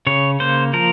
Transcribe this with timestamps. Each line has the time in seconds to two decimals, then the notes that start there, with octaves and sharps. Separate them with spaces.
0.07 C#3 C#5
0.40 A#3 C5
0.73 F3 A#4